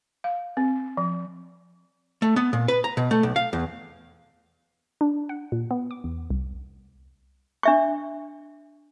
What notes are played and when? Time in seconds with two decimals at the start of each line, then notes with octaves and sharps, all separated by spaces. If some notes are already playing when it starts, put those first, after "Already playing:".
0.24 F5
0.57 C4
0.97 F3
2.22 A3
2.36 B3
2.53 A#2
2.68 B4
2.84 A#5
2.97 B2
3.11 A3
3.23 B1
3.36 F5
3.53 E2
5.01 D4
5.29 F#5
5.52 A#2
5.71 B3
5.91 D6
6.04 E2
6.30 C2
7.63 D4 E5 C#6